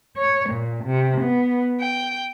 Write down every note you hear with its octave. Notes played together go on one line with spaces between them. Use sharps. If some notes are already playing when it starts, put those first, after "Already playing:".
C#5
A#2
C3
B3
G5